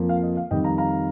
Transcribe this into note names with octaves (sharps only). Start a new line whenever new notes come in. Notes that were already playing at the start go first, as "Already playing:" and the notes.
Already playing: F2 F3 A#3
F5
D#5
F5
F2 D#3 G3 D#5 G5
F5 A#5
F5 A#5